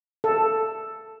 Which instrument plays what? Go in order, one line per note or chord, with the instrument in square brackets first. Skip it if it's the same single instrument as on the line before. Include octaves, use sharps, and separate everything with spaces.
[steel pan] A4